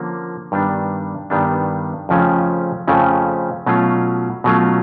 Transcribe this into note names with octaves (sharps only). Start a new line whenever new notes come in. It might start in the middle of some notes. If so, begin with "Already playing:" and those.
Already playing: D3 F3 A#3 C#4
G2 D#3 G3 B3 D4
G2 D#3 G3 B3 D4
F2 C#3 F3 A3 C#4
F2 C#3 F3 A3 C#4
B2 F#3 A3 C#4 F4
B2 F#3 A3 C#4 F4